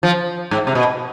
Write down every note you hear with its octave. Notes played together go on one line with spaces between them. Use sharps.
F3
G#2
C3
B2